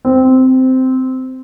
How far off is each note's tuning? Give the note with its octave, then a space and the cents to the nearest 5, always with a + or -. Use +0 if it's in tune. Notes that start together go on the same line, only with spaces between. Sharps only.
C4 -10